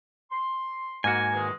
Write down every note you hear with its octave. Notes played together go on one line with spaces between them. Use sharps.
C6
G#2 A#3 F#4 G#5
E2 D#3 G#3